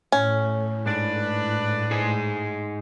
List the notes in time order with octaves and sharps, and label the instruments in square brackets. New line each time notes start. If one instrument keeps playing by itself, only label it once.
[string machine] A2 [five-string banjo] C#4
[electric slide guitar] G#2 [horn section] D4 B4
[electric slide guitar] G#2 D#4 G#4